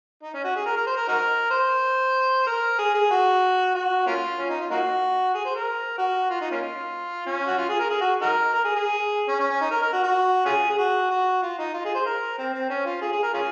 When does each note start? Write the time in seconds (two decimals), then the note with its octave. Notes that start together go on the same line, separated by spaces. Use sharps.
0.23 D#4
0.34 C#4
0.44 F#4
0.56 G#4
0.66 A#4
0.76 A#4
0.87 C5
0.97 A#4
1.08 D#4 F#4 A#4
1.51 C5
2.47 A#4
2.78 G#4
2.94 G#4
3.11 F#4
3.75 F#4
4.07 A#3 C#4 F4
4.39 C#4
4.49 D#4
4.60 F4
4.70 A#3 D#4 F#4
5.34 G#4
5.45 C5
5.55 A#4
5.98 F#4
6.30 F4
6.41 D#4
6.51 A#3 C#4 F4
7.26 C#4
7.47 F#4
7.58 F4
7.69 G#4
7.79 A#4
7.90 G#4
8.01 F#4
8.22 D#4 F#4 A#4
8.54 A#4
8.64 G#4
8.75 G#4
9.28 C#4
9.40 C#4
9.50 C#4
9.61 D#4
9.71 A#4
9.82 A#4
9.93 F#4
10.03 F#4
10.46 C#4 F4 G#4
10.70 G#4
10.78 F#4
11.10 F#4
11.42 F4
11.58 D#4
11.74 F4
11.85 G#4
11.95 C5
12.06 A#4
12.38 C4
12.54 C4
12.70 C#4
12.86 F4
13.02 G#4
13.12 G#4
13.23 A#4
13.34 C#4 F4 G#4